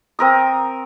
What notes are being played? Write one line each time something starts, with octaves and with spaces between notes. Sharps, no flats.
C4 A#4 D#6